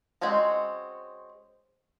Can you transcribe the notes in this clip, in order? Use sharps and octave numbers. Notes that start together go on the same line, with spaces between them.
G#3 C4 C#4 F#4